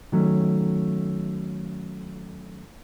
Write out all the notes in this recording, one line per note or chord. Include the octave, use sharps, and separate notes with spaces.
D#3 F#3 A3 C#4